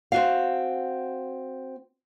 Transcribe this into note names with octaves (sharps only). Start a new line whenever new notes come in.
C4 F#4 F5